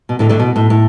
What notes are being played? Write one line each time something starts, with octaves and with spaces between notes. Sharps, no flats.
B2
A2 D3
A2 D3
B2
A2
A2